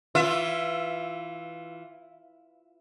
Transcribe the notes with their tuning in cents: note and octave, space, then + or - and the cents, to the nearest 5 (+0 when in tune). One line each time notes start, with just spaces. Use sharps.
E3 -5 F4 +0 E5 +20